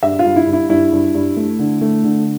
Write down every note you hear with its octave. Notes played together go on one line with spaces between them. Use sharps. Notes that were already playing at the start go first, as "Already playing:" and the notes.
G2 E5
F4
G2
E4
G2
E4
G2 E4
G2
G2
A3
D3
A3
D3